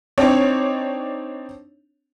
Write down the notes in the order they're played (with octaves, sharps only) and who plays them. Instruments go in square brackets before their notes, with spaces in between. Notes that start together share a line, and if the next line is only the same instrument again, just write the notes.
[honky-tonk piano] C4 D4 D#4 C#5